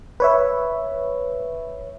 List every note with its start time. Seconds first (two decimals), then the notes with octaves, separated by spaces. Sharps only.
0.20 B4 C#5 E5